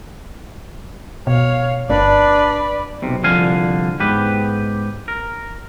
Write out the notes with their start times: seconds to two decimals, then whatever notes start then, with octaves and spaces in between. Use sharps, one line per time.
1.27 B2 C#5 F5
1.90 G1 D4 B4 D5
3.02 B1 C3
3.23 C2 D3 F3 F5 G#5
4.00 G#2 B3 G4 B4
5.08 A#4